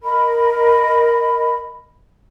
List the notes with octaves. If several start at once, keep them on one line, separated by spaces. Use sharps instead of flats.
A#4 D#5 B5